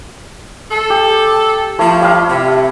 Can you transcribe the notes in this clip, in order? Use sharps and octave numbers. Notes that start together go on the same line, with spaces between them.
A4
G4
F3 A3 E4
G3 E4 F5
C3